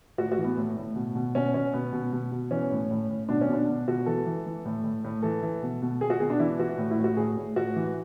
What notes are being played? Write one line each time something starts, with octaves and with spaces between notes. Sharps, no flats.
A2 F#4
F#4
E3
B3
A2
A2
B2
B2
B2 C#4
B2 C#4
B2 B3
B2
B2
B2
E3 C#4
A2
A2
A2
B2 D4
C#4
B2 D4
B2
B2 F#4
E3 A4
E3
E3
A2
A2
A2
E3 A4
E3
B2
B2
B2 G#4
F#4
B2 G#4
D4
E3 E4
E3 F#4
A2
E4
A2
F#4
A2 G#4
A2
A2 F#4
E3